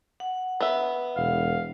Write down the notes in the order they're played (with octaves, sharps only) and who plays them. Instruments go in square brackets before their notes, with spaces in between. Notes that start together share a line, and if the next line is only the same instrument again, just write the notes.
[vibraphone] F#5
[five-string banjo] B3 E5
[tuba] E1 [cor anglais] F5